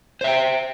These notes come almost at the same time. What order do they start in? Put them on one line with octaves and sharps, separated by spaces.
C5 E5 G5